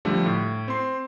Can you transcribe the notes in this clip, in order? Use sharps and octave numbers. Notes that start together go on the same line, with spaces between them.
D3 F3 G3 A3
A2
C4 C6